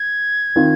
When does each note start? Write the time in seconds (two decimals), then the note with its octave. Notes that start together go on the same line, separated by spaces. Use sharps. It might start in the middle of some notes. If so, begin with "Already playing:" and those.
Already playing: G#6
0.56 D#3 C4 F4